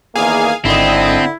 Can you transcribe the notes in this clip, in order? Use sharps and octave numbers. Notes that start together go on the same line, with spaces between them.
E2 D#3 A#3 G#4 F5 G#5
G#1 D3 C4 E4 D#5